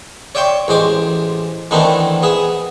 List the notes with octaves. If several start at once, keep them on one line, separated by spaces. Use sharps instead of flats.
C#5 D5 E5 G5 C6 C#6
A1 G#3 C5 D6
D#3 E3 A3 B3 C4 D4
B3 G#4 E5